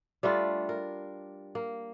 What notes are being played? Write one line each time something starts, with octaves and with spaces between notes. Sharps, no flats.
G3 A3 D4 F4
A#4
A#3